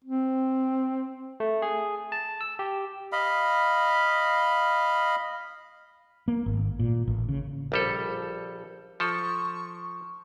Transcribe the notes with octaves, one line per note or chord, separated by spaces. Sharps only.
C4
A3
G#4
A5
E6
G4
D#5 F5 B5
A#3
G#1
A#2
A1
C#3
A#1 G3 A4
F3 A4 C#6